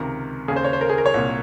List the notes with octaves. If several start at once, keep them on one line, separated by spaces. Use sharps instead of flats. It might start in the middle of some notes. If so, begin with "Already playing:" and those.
Already playing: C#2 C3 D#3 A#4
D#2 C#3 G#4
C5
C#5
C5
A#4
G#4
A#4
C#5
C2 A#2